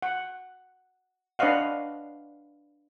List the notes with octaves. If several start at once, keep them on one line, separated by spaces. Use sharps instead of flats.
F#5
D4 B4 C#5 D#5 F5 F#5